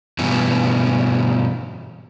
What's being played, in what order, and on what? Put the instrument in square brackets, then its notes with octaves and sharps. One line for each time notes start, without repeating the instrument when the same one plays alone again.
[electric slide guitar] G2 B2 E3